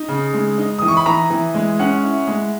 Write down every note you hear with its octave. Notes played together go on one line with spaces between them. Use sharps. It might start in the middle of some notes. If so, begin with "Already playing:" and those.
Already playing: D#4
C#3
G#3
D#4
E3 D#6
C#6
B5
E3 A#5
E3
G#3
C#4 F#5
E4
G#3